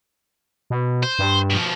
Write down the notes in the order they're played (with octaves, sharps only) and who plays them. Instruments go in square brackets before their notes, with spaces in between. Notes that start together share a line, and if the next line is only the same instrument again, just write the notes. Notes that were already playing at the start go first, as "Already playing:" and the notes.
[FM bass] B2
[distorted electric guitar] C5
[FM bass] G2
[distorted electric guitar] B2 F3